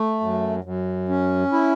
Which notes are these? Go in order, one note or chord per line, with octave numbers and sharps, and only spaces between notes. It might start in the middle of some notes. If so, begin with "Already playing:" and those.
Already playing: A3
F#2
F#2
C#4
E4